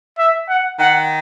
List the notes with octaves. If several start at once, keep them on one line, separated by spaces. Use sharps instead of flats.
E5
F#5
D#3 F#5